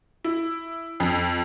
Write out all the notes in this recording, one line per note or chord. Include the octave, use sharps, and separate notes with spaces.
E4
F2